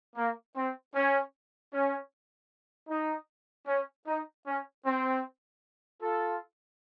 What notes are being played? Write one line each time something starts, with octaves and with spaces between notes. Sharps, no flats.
A#3
C4
C#4
C#4
D#4
C#4
D#4
C#4
C4
F4 A4